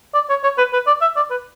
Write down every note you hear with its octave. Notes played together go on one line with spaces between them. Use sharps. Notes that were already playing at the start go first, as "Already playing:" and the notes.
D5
C#5
C#5
B4
B4
D5
E5
D5
B4